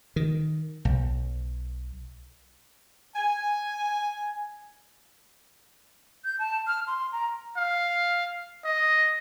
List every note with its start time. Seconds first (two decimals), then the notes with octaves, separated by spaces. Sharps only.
0.16 D#3
0.85 B1
3.16 G#5
6.24 G6
6.39 A5
6.67 F6
6.87 C6
7.12 A#5
7.56 F5
8.65 D#5